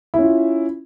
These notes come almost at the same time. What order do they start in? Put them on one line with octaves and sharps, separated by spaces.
E4 C#4 F4